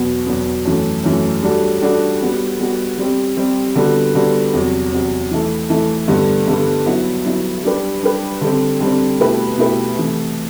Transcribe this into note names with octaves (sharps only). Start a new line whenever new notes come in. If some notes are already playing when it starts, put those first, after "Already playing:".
Already playing: E2 B2 F#3 B3
E2 B2 F#3 B3
F#2 E3 A3
F#2 E3 A3
G3 D4 F#4 A4
G3 D4 F#4 A4
G3 B3 F#4
G3 B3 F#4
G3 C4 G4
G3 C4 G4
D3 G3 B3 F#4
D3 G3 B3 F#4
E2 C3 F#3
E2 C3 F#3
E3 A3 E4 A4
E3 A3 E4 A4
G2 D3 G3 B3
G2 D3 G3 B3
F#3 B3 E4
F#3 B3 E4
G3 D4 G4 B4
G3 D4 G4 B4
D3 G3 C4
D3 G3 C4
B2 A3 E4 G4 B4
B2 A3 E4 G4 B4
C3 E3 A3